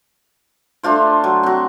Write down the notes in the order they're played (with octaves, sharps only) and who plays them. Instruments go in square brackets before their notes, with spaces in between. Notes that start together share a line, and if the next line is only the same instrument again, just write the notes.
[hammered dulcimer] A3 D4 F4 C5
F#3
C4 F#4